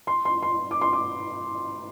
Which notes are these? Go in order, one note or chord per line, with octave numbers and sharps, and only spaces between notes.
C6
C6
C6
D6
C6
D6